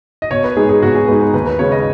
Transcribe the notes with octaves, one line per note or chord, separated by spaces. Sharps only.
D#5
B2 C#5
B4
G#3 D#4 G#4
G#4
B2 F#4
G#4
G#3 D#4 B4
B4
D#2 B4
B4
C#3 G#3 C#5
D#5